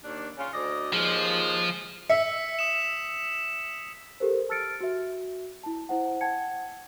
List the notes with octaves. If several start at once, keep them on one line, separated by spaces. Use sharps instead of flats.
D#2 D4
C#3 C#4 F4
D2 D5 D#5
D#2 F3 G#3
E5 E6 B6 C#7
D#6 E7
G4 A4 A#4 C5
A5 E6 F6 A6 C#7 D7
F#4 E5
E4 A5
E4 C5 F#5
F#5 G5 A5 G#6 C#7